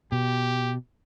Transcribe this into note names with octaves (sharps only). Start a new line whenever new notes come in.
B2 G4